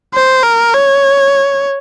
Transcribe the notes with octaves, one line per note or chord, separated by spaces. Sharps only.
C5
A#4
C#5